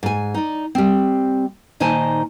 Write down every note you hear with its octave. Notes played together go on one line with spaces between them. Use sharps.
G#2 G#5
D#4 D5
G3 C4
A#2 D#3 D#4 C5 G#5 A5